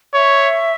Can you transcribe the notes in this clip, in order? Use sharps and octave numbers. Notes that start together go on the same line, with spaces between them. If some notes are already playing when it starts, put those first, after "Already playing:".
C#5 E5